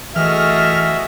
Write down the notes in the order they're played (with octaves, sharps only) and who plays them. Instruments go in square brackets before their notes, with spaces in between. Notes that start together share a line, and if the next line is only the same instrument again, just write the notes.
[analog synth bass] E3 [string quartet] A3 D#5 [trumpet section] F#4 G#4 E5 [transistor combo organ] F6